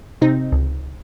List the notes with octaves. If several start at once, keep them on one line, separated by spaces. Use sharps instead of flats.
C3 C4 D#4
C#2